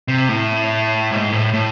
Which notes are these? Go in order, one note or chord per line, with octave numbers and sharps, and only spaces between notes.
C3
A2
G#2
A2
A2